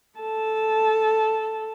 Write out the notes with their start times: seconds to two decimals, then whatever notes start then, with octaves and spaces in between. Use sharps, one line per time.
0.19 A4 A5